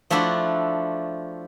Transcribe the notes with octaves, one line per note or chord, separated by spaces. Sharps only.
F3 A3 D4 E4 F#4